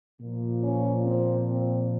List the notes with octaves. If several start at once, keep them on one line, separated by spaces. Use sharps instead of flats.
A#2 F3
C#4
C4
C4